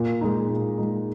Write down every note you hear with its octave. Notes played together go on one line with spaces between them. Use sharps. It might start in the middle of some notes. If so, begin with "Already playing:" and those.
Already playing: A#2
G#3 D#4
A#2
G#3 D#4